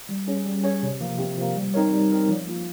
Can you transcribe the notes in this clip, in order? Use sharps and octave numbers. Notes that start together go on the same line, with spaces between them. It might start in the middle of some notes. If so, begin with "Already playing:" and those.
G3
C#4 G#4 C#5
G3
C#4 G#4 C#5
C3
F3 A#3
C3
F3 A#3
G3
C4 D#4 A#4 C#5
G3
C4 D#4 A#4 C#5
F3
A#3 F4